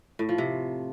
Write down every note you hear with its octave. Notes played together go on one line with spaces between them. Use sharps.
A2
F3
C3